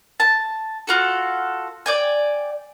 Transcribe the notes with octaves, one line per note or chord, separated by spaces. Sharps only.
A5
F4 F#4 A4
D5 G5 G#5